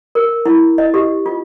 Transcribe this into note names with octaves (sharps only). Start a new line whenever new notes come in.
A#4
E4
D#5
G4
F4